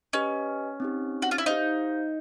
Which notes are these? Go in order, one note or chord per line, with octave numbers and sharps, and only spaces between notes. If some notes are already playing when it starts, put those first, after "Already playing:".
C#4 G4 B4 D#5 G#5
C4 D#4 G4
F#4
F4
E4
D#4 G4 C5 F5